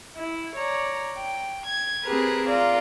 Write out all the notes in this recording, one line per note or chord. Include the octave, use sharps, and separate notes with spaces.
E4
C#5 D5 A#5
G5
G#6
C4 G4 G#4 A#4 B4
F4 A#4 D5